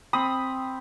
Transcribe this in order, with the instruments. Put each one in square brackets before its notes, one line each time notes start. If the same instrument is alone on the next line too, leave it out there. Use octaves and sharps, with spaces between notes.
[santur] C4 B5 D#6